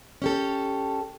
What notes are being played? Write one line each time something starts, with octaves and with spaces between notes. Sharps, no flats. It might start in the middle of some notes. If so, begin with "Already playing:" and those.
C#4 G4 A4